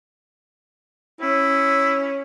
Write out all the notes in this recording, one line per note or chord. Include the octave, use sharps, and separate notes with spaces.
C#4 E4